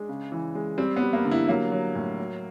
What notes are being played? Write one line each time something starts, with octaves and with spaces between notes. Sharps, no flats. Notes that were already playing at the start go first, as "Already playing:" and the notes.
Already playing: G#3 D4
C#3
E3
G#3
G3 C4
B3
G3
A#3
D3
E4
F#3 A#3
F#3
A2
F#3